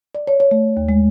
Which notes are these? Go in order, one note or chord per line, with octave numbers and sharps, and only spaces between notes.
D5
C#5
C#5
A3
D#2
G#3